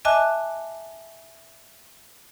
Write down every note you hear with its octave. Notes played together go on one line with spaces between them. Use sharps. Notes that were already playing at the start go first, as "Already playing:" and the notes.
D#5 E5 G#5 A5 D6 F#6